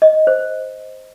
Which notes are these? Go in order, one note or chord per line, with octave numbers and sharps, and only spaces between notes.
D#5
C5